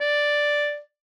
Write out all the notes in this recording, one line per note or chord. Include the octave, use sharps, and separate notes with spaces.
D5